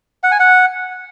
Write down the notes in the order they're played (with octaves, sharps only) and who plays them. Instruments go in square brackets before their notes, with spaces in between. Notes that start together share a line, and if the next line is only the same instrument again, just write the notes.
[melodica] F#5
G#5
F#5